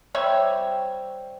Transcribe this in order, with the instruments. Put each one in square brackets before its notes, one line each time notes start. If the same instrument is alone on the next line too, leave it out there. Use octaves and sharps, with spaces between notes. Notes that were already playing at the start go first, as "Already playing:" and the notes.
[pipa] G3 C4 C#5 E5